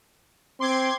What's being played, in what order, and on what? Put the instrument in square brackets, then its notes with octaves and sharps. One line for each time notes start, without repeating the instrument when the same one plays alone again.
[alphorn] C4 [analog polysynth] C6 D6 G#6